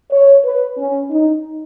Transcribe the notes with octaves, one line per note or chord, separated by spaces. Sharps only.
C#5
B4
C#4
D#4